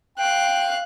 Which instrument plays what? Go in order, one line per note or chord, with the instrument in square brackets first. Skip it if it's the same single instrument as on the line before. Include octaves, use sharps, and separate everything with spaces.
[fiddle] F5 F#6 [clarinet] G5